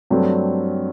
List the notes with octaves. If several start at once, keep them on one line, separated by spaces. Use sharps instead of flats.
G2 F#3 A3 C4